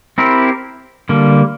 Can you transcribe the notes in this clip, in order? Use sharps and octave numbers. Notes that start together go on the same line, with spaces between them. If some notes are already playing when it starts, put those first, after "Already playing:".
C4 E4 G4 A#4
D3 G3 A#3